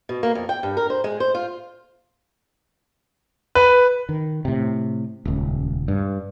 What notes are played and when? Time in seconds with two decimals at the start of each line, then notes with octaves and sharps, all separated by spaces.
0.09 B2
0.23 A#3
0.35 F2
0.49 G5
0.63 G2
0.77 A#4
0.90 C5
1.04 G#3
1.20 C5
1.35 F4
3.55 B4
4.09 D#3
4.45 A2 C3
5.25 D#1 C#2
5.88 G2